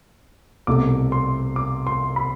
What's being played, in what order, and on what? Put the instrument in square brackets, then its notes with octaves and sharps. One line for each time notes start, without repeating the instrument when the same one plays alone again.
[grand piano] C2 B2 A3 D6
C6
D6
C6
B5